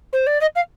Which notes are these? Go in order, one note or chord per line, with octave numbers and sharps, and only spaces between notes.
C5
D5
D#5
F5